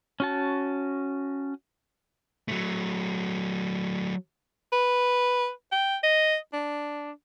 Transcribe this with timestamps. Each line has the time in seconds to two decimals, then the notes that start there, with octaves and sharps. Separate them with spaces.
0.20 C#4 F#4 A5
2.48 F#3 A3
4.73 B4
5.72 G5
6.03 D#5
6.53 D4